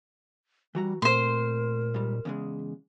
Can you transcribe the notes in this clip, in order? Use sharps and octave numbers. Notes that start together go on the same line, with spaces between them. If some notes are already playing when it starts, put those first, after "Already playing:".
E3 G3 F#4 A#5
A#2 A3 C4 A#4 C5 C6
G#2 G3
E2 C#3 G#3